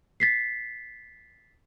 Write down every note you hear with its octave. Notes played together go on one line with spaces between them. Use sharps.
A6 B6 C7